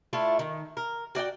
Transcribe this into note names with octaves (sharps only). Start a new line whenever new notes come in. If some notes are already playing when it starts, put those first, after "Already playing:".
A3 D4 E4 F4
D#3
A#4
F#4 D5 D#5 G5